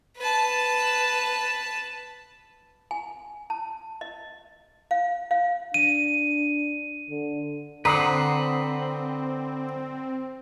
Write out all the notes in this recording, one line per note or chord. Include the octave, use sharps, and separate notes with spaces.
B4 A5
G#5
A5
D#5
F5
F5
D4 D#7
D3
D3 C4 B4 C5 F#5 A#5 D#6